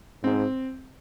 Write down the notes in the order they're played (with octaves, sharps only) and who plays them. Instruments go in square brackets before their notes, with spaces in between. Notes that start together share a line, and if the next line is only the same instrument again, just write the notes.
[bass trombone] G#2 [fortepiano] C4